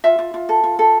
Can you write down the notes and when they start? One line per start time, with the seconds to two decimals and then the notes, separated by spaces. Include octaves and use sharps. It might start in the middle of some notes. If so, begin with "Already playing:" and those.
0.04 F4 E5
0.19 F4
0.34 F4
0.49 A4
0.64 F4
0.79 A4